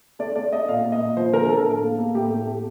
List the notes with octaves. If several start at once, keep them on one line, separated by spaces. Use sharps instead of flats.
A3 D5
A3 D5
A3 D#5
A#2 F5
A#3
D#5
A#2
F3 C5
D3 A#4
D3 A4
A2
A#3
A#3
A2 G4
A2
A3